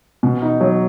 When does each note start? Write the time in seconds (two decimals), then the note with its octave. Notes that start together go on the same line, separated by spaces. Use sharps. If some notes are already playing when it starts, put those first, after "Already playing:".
0.23 B2
0.42 D#4
0.61 F#3